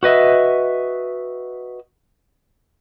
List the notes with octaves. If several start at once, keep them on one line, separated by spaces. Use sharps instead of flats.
F#4 B4 D#5 E5